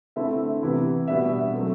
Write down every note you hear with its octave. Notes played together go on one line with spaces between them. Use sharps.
D3 A3 C4 E4 E5
C3 E3 B3 E4
B2 G3 B3 D4 E5
F#3 A3 C4